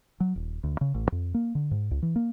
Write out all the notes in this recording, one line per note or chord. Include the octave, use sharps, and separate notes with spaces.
F#3
D#1
D2
C#3
A1
F2
A#3
D3
G#2
C#2
E3
A#3